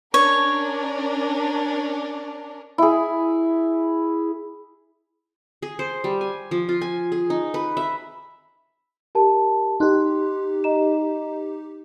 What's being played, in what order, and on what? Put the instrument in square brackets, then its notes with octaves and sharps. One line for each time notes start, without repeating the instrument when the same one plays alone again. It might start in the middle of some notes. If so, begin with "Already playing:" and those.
[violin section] C#4 D4 A#4 [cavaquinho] C#5
[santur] E4 G#4
[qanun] G#4
C5
G3
G#5
F3
F4
G#5
G#4
D#4
B4
E5
[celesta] G4 A#4 A5
[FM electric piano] D#4 G4 [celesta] C6 F#6
[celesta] D#5 A#5 E7